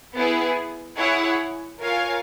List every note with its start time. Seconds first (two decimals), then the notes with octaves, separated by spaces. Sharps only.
0.14 B3 E4 G#4
0.97 E4 G#4 C#5 F#5
1.80 F4 A#4 C#5 F5 G#5